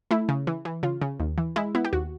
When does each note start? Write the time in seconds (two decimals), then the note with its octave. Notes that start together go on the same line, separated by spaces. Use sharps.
0.11 A3 E4
0.29 C#3
0.47 E3
0.65 E3
0.83 C#3 F4
1.01 C#3
1.20 D#2
1.38 E3
1.56 G#3 E4
1.75 B3 E4
1.85 G4
1.93 D#2 F#4